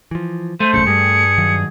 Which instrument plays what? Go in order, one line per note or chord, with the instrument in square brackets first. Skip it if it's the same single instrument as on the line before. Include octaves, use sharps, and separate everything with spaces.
[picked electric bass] E3 F3
[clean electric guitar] A3 [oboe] C5 [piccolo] D#7
[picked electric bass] D#1 B1 C#3 [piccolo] C#7
[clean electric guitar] G2 [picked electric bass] G3 A3 [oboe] G#4
[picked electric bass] D#3 F#3